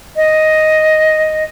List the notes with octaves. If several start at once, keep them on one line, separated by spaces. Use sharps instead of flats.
D#5